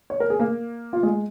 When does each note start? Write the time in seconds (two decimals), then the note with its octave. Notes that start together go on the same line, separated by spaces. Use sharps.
0.10 C#5
0.20 A#4
0.30 G#4
0.39 A#3 A#4
0.93 F4
1.03 G#3 G#4